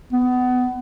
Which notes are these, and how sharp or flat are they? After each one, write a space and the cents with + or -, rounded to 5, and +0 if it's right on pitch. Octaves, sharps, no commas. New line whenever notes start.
B3 +25